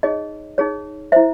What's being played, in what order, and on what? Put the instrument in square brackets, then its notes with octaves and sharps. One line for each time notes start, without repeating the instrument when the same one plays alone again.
[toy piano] D#4 G#4 C#5 D#5
D#4 G#4 C#5
E4 C5 E5